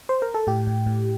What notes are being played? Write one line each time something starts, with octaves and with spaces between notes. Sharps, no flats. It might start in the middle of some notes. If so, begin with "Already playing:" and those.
C5
A#4
A4
A2 G4
A2
A2